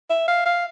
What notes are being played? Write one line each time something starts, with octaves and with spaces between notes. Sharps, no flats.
E5
F5
F5